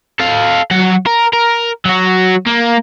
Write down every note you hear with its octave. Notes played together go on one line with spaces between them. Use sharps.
A4 F5
F#3 F#5
A#4
A#4
F#3 F#4
A#3